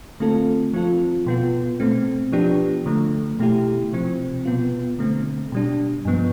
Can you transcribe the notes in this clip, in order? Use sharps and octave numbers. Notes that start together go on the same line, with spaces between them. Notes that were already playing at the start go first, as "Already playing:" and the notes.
D3 A3 C4 F4 A4
F3 C4 F4 A4
B2 B3 F4
B2 A3 C4
F3 B3 D4 G4
D3 F3 A3
B2 A3 E4 G4
C3 F3 C4
B2 B3 F4
D3 A3 C4
B2 G3 D4
G2 F3 B3